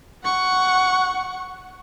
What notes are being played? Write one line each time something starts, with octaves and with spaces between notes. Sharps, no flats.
F#5 C#6